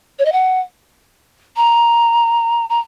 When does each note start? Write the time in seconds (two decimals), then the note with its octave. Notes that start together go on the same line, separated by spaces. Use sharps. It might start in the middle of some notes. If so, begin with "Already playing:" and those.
0.19 C#5
0.25 D#5
0.32 F#5
1.56 A#5
2.69 A#5